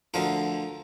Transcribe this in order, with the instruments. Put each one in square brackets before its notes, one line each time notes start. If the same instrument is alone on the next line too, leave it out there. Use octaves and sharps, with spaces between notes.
[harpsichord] D2 D3 F3 A#4